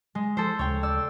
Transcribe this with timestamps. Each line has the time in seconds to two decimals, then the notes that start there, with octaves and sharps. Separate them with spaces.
0.15 G#3
0.37 F3 A4 C5
0.59 D2 C#3 G#3 C#5 G5
0.83 D5 E6